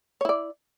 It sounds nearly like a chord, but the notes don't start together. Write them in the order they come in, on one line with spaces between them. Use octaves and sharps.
C#5 E4 D5